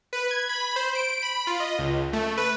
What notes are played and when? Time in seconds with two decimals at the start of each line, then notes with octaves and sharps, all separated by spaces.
0.13 B4
0.31 G#6
0.49 B5
0.76 C5
0.95 D7
1.22 B5
1.47 F4
1.60 D#5
1.79 C#2
2.13 A3
2.37 B4